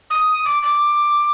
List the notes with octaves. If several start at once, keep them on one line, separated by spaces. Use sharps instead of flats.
D#6
D6
D6